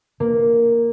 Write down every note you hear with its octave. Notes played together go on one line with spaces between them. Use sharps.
A#3